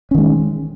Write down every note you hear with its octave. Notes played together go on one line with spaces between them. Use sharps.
D#3 G#3 C#4